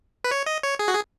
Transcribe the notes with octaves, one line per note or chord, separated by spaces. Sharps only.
B4
C#5
D#5
C#5
G#4
F#4
G#4